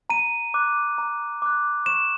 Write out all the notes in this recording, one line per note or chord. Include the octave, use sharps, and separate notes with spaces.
A#5 D#7
D6 F#6
A#5
D6 F#6
C#6 E7